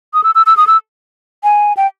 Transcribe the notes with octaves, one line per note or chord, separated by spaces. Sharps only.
D#6
E6
E6
E6
D#6
E6
G#5
G5